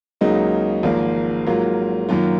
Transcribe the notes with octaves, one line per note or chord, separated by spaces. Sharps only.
C#2 C#3 F#3 A#3 D#4
G#1 G#2 F3 A#3
G#2 F#3 A#3 F4
F#2 D#3 F#3 A#3 F4